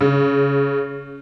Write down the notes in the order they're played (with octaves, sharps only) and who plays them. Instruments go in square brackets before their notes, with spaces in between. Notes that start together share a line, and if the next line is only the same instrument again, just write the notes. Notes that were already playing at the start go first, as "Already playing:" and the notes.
[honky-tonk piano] C#3